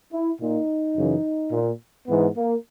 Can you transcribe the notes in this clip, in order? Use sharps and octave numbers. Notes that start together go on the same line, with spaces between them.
E4
A#2 D#4
F#2 C#3 E3
A#2
G#2 E3 B3
A#3